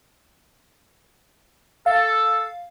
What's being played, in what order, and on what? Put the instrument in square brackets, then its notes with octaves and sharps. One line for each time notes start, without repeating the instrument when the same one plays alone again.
[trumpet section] A4 [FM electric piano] F5